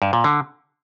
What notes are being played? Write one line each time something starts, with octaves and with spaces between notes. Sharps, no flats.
G2
A#2
D3